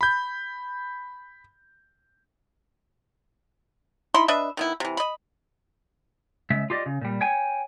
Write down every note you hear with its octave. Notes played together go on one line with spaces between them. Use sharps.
B5 G6
D#4 E4 B5 C6
D4 B4 D#5 E5
D#3 B3 E4
C3 E3
D#5 B5
C#3 G#3 E5
F4 G4 D5 D#5
C#3
A#2 G3
C#5 G5 G#5